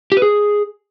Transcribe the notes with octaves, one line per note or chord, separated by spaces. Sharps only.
G4
B4
G#4